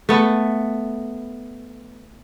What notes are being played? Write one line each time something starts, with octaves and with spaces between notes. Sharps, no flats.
A3 B3